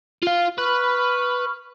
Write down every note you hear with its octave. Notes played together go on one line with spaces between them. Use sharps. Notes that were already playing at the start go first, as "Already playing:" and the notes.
F4 F5
B4 B5 C#6 F6